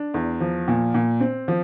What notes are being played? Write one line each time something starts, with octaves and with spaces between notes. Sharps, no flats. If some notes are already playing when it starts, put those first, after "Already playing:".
Already playing: D4
E2
F3
A#2
A#2
C4
F3